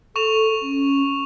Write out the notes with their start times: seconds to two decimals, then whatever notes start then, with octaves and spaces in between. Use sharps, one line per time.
0.16 A4 C#6 E7 F7
0.62 C#4